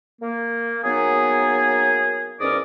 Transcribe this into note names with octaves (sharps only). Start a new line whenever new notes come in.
A#3
F#3 A#3 B3 D#4 G#4
E2 G#2 C#4 A#4 D5 D#6